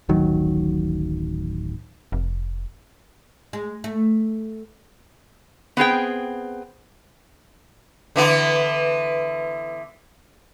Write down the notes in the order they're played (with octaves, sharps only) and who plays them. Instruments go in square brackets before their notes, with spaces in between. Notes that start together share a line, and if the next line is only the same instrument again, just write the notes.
[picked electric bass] D1 A1 D#3 F#3
[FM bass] F1
[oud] G#3
A3
[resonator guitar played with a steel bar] B3 C4 G#4 G5
[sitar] D3 E3 B3